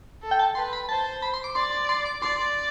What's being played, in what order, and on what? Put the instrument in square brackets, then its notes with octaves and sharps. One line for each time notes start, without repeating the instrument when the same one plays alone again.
[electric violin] A4
[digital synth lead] G5
A5
[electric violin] B4 [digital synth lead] C6
[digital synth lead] B5
[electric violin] C5 [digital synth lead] A5
[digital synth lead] B5
C6
D6
[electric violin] D5 [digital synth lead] C6
[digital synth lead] C6
D6
[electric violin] D5 [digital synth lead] C6